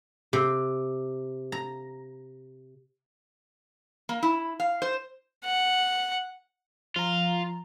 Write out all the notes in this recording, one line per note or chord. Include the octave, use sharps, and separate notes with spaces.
C3
A#5
A#3
E4
F5
C5
F#5
F3 F4 A#5